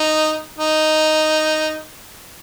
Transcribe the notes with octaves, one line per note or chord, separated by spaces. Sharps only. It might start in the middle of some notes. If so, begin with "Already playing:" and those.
Already playing: D#4
D#4